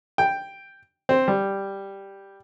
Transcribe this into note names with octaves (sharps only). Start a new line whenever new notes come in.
G5
C4
G3